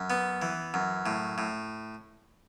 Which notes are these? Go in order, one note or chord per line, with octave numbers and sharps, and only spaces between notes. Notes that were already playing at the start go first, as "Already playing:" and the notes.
Already playing: F#2
B3
E3
F#2
A2
A2